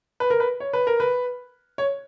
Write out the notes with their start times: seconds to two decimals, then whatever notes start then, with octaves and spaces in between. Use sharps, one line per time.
0.20 B4
0.30 A#4
0.40 B4
0.60 C#5
0.73 B4
0.87 A#4
1.00 B4
1.78 C#5